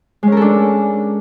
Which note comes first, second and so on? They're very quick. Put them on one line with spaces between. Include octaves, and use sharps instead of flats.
G#3 C#4 A#4 A4 D4